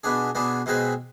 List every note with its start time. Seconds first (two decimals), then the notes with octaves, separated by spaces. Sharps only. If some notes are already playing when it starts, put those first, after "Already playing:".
0.04 B2 B3 D4 G#4
0.35 B2 B3 D4 G#4
0.66 B2 G#3 C4 G#4 B4